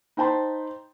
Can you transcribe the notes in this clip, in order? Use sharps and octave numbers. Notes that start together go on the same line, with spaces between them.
D#4 C5 G5 A5 B5 C6